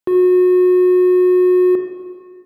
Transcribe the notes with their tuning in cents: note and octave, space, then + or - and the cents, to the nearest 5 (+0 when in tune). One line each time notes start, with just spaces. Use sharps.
F#4 -30